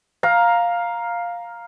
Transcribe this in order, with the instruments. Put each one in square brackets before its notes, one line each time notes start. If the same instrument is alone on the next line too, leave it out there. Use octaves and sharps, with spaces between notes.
[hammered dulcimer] F5 A#5